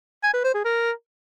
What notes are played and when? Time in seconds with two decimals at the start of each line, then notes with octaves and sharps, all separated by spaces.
0.23 G#5
0.34 B4
0.44 C5
0.54 G#4
0.65 A#4